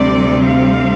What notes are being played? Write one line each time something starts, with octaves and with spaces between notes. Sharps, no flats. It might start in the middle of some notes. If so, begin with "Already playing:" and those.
Already playing: D2 C3 G3 C4 D5
F5